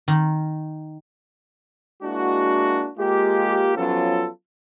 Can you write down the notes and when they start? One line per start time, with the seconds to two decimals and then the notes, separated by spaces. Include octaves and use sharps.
0.08 D#3
2.03 G#3 A#3 D4 E4 F#4
2.98 G#3 A#3 F4 G4
3.76 F3 F#3 B3 C#4 F4 A4